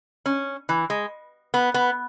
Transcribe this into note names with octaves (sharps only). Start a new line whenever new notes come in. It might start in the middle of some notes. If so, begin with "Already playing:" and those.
C#4
E3
G#3
B3
B3